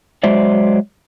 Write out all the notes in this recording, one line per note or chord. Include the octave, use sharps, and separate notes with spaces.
F#3 G#3 C5 D5 E5